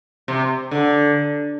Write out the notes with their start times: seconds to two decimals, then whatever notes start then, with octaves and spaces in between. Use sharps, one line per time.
0.28 C3
0.71 D3